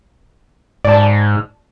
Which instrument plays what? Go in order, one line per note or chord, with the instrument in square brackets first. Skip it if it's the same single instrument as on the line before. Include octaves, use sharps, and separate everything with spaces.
[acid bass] G#2 [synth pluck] D5 A5